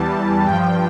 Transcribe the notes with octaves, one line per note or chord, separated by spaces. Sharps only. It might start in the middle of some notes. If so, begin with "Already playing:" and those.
Already playing: E2 E3 G3 A5
G2 F3 G5